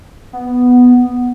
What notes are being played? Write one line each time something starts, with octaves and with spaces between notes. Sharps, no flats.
B3